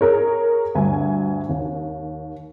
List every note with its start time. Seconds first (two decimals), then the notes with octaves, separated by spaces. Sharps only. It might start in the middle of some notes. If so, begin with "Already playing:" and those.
0.01 G#4 A#4 C#5
0.75 D2 G2 G#5
1.49 D#2